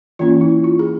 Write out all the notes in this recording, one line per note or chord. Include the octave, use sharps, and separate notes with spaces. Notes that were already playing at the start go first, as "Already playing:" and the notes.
E3 A#3 C#4 F4
E4
F4
G#4